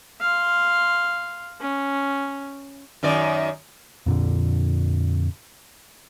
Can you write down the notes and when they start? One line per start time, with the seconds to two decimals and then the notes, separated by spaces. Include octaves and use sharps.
0.21 F5 C6
1.60 C#4
3.03 F#2 D#3 D5
4.06 F2 A#2 D3